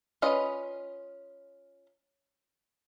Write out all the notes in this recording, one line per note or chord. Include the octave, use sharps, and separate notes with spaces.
C#4 F4 B4 D#5